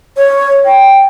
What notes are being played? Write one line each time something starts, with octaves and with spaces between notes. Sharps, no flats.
C#5
G5